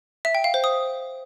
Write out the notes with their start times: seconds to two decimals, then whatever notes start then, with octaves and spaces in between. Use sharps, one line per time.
0.25 E5
0.35 G5
0.44 F5
0.54 C5
0.64 D#6